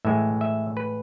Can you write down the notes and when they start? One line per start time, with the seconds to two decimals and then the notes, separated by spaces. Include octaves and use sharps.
0.05 A2 E3 G#3 E5
0.41 E5
0.77 B4